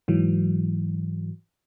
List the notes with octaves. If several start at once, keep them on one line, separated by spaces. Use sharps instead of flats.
G#2 E3 F#3